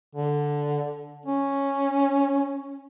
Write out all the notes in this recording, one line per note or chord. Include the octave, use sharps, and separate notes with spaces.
D3
C#4